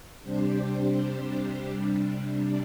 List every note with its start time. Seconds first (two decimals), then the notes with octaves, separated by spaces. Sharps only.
0.24 C3 G3 D4 G4 C5
1.69 C3 G3 D4